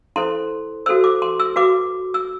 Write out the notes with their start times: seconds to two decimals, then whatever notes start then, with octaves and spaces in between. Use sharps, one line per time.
0.16 E4 A4 C5 C6
0.86 F#4 A4 C5 E6
1.04 D6
1.22 C6
1.40 E6
1.56 F#4 B4 D6
2.14 E6